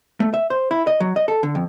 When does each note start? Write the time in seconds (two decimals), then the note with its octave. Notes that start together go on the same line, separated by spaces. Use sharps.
0.20 A3
0.34 E5
0.50 C5
0.71 E4
0.87 D#5
1.00 F#3
1.16 D#5
1.28 A4
1.43 D3
1.55 F2